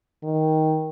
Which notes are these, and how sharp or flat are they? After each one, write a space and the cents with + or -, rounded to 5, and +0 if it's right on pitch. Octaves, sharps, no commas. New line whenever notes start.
D#3 +10